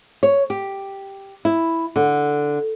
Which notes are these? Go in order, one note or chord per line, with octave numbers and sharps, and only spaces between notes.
C#5
G4
E4
D3